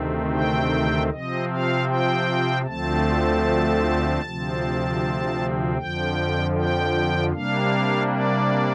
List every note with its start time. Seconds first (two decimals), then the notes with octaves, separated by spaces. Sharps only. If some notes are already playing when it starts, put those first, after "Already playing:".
Already playing: D2 C3 D#3 A3 C4
0.33 G5
1.10 C3 F3 C4 D#5
1.49 F5
1.88 G5
2.65 D2 D3 F3 A3 C4 A5
4.22 D2 C3 F3 C4
5.77 F2 D3 F3 G5
6.55 G5
7.33 C3 G3 A#3 D4 F5
8.10 D5